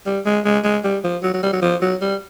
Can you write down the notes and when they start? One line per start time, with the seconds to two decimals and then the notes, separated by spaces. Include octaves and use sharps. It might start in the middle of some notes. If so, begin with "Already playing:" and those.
0.06 G3
0.26 G#3
0.45 G#3
0.64 G#3
0.84 G3
1.04 F3
1.23 F#3
1.34 F#3
1.43 G3
1.53 F#3
1.62 F3
1.82 F#3
2.01 G3